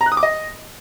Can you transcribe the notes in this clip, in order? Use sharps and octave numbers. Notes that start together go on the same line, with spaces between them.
A#5
F#6
D#6
D6
D#5